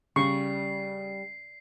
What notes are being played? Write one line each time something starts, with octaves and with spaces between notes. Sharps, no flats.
C#3 G3 C#6 C7